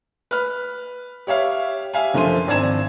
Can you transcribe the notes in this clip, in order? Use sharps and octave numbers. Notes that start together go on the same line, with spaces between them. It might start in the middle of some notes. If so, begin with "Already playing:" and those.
B4 F6
G4 C#5 E5 F5
G4 E5 F5 G#5
F#1 D3 F3 E5 C6 D#7
G#1 C4 D4 A5 G#6 E7